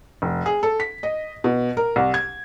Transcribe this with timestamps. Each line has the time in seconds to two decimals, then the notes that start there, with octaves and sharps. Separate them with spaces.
0.22 F1
0.46 G#4
0.63 A4
0.80 B6
1.03 D#5
1.44 B2
1.77 A#4
1.96 C2
2.14 G#6